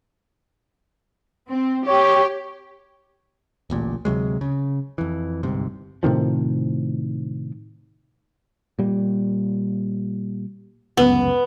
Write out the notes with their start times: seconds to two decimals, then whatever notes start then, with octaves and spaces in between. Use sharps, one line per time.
1.50 C4
1.88 G4 C#5
3.70 D1 A1 A#2
4.05 D2 C3 F#3 G#3
4.41 C#3
4.98 F2 E3
5.43 G1 C2 G#2 C3
6.03 A2 C3 D#3 F3
8.79 A#2 G3
10.97 G1 C#2 F#2 B3